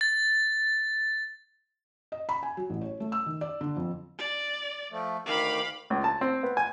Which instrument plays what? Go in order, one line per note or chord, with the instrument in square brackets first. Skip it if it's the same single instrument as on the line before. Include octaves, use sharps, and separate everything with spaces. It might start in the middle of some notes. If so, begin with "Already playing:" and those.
[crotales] A6
[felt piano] D#5
B5
G#5
F#3
A1
C#5
A3
E6
D#3
D5
D3
F2
[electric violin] D5
[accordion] F3 A3
[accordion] D2 D#3 D6 [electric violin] F5 B5
[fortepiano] C#2
A5
C4
B3
G#5